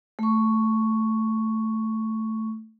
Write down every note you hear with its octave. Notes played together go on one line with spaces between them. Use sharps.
A3 C#6